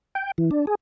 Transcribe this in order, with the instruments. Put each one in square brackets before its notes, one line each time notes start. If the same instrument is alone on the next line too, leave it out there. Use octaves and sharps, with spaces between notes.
[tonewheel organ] G5
E3
D4
G#4